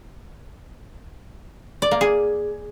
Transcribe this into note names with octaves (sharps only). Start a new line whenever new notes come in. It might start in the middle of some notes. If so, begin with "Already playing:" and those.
D5
A#3
G#4